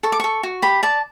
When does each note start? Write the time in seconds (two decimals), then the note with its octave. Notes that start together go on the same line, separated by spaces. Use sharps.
0.03 A4 C#6
0.12 D6
0.20 A4 C#6
0.43 F#4
0.62 G4 B5
0.83 D5 A5